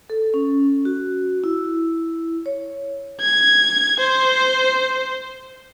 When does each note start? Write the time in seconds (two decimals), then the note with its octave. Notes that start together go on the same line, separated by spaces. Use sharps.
0.10 A4
0.34 C#4
0.85 F#4
1.44 E4
2.46 C#5
3.20 G#6
4.00 C5